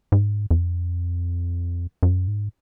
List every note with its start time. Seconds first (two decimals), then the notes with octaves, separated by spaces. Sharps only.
0.12 G#2
0.51 F2
2.03 F#2
2.28 G#2